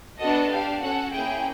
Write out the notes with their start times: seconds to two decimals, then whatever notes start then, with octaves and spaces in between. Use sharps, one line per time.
0.19 B3 D4 F#4 A4 D#5
0.50 D4 G4 F5
0.81 C#4 F#4 A4 F#5
1.12 A#3 C#4 E4 G#4 G5